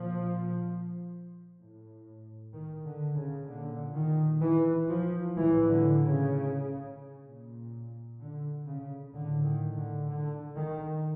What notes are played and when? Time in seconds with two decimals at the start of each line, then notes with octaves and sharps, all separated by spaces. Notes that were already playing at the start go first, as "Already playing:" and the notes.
Already playing: A#2 F3
1.59 A2
2.53 D#3
2.85 D3
3.16 C#3
3.47 A#2 D3
3.94 D#3
4.42 E3
4.89 F3
5.37 A2 E3
5.68 D3
6.00 C#3
7.26 A#2
8.20 D3
8.67 C#3
9.14 A2 D3
9.45 D#3
9.77 D3
10.09 D3
10.56 D#3